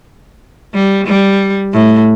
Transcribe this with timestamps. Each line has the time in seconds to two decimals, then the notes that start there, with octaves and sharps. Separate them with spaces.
0.74 G3
1.07 G3
1.73 A2